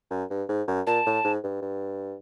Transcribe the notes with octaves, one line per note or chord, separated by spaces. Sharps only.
F#2
G2
G#2
F#2
A#2 A5
A2
G#2
G2
G2